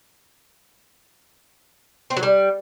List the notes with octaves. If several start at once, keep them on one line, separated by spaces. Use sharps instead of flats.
C4
F#3
G3